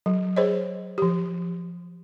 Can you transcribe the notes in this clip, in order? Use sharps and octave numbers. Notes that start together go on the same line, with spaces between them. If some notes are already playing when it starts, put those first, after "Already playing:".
F#3
G#4 C5 C#5 D#5
F3 G4